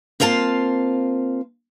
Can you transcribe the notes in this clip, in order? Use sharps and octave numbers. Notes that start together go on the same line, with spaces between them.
A#3 C4 F4 F5 A5